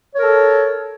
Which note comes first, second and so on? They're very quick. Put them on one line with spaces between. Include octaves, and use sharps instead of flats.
C#5 A#4 A4